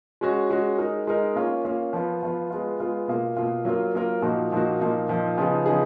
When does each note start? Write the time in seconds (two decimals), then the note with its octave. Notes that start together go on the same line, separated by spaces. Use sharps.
0.21 G#3 C#4 F#4
0.50 G#3 C#4 F#4
0.78 G#3 D#4 A#4
1.07 G#3 D#4 A#4
1.36 A#3 C#4 F4
1.65 A#3 C#4 F4
1.93 F3 B3 F4
2.23 F3 B3 F4
2.51 G#3 B3 F4
2.80 G#3 B3 F4
3.08 B2 A#3 F4
3.37 B2 A#3 F4
3.65 F#3 A#3 F4 A#4
3.94 F#3 A#3 F4 A#4
4.22 A#2 F3 A#3 D#4 F#4
4.52 A#2 F3 A#3 D#4 F#4
4.80 A#2 F3 A#3 D#4
5.09 A#2 F3 A#3 D#4
5.37 C#3 F3 B3 D#4 G#4
5.66 C#3 F3 B3 D#4 G#4